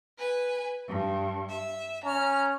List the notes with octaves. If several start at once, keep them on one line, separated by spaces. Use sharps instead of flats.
B4 G#5
G2
E5
C#4 A#5 F6